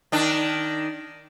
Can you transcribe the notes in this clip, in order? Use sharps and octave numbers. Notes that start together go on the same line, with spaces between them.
D#3 D4